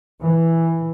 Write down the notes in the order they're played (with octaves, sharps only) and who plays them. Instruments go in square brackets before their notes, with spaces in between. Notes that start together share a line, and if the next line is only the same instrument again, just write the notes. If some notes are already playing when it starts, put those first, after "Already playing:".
[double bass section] E3